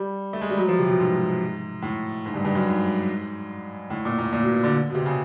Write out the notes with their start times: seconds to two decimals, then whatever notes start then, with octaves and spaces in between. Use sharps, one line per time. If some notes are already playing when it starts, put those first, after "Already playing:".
Already playing: G3
0.33 A3
0.41 G#3
0.50 G3
0.58 F#3
0.68 F3
0.78 C3
0.89 B2
0.99 G#2
1.82 A2
2.26 G#2
2.34 G2
2.45 G2
2.55 F#2
2.66 G#2
3.90 A2
4.05 A#2
4.18 A#2
4.33 A#2
4.42 B2
4.53 B2
4.64 D3
4.90 B2
4.95 C3
5.06 C#3